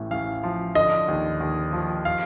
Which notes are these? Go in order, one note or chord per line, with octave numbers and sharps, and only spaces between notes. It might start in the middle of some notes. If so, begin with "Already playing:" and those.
Already playing: A1 A2
A1 F5
F3
D3 D#5
D#2
D#2
F3
F5